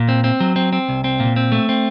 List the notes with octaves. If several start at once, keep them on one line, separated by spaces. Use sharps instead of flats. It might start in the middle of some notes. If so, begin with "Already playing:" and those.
Already playing: A#2
C4
C4
F#3
C4
C4
C2
C4
A#2
C4
A3
C4